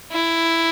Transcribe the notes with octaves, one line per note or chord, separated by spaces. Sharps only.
E4